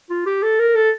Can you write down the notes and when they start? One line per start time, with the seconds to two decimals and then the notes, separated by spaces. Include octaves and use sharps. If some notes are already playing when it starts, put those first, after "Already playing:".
0.10 F4
0.26 G4
0.42 A4
0.59 A#4
0.75 A4